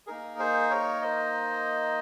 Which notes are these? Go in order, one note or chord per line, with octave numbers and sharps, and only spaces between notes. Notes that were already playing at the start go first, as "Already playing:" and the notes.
A#3 D#4 G#4 A#4
G#4 C5
A#4 C#5
C5 D#5